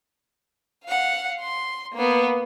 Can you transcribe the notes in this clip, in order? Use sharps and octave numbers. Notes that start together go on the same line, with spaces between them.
F5 F#5
C6
A#3 B3